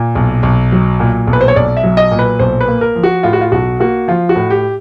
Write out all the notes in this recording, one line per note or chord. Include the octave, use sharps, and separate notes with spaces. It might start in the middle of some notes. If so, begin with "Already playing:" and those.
Already playing: A#2
B1
B1
F#3
A#2
B1
B4
C5
C#5
B1 D5
E5
F#3
D#5
A#2
B4
B1 C5
B4
A#3
A#4
F3
F#4
A2 F4
F#4
F4
B1 F#4
A#3 F#4
F3 F4
F#4
A2
G4